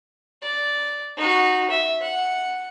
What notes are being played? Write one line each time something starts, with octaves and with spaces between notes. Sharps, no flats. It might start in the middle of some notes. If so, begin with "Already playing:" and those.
D5
D#4 F#4
E5
F#5